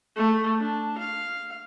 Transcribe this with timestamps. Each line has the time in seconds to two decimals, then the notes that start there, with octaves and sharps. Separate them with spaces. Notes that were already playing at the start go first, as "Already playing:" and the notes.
0.16 A3
0.60 D4
0.98 F5